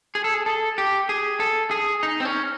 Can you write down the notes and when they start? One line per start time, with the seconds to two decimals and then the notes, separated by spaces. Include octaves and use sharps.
0.15 G#4
0.24 A4
0.34 G#4
0.46 A4
0.78 G4
1.09 G#4
1.40 A4
1.71 G#4
2.03 D#4
2.20 C4
2.25 C#4